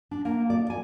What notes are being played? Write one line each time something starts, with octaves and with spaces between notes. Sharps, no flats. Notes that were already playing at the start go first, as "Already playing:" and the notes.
D4
A#3
D5
G#5